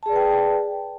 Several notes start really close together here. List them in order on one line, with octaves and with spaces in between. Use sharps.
A5 G#4 D5 B4 G5